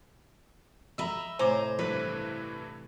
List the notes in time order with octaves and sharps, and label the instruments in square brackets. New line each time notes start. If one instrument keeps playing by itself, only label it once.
[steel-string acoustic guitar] D#5 E5 [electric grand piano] A#5 B5 E6
[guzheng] A2 C3 [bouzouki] C5 [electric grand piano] G#5 A#5 D6
[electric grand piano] G2 E3 [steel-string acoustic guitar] B4